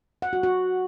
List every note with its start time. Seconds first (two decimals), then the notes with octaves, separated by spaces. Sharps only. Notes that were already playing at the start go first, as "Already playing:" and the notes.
0.22 F#5
0.33 F#4
0.43 F#4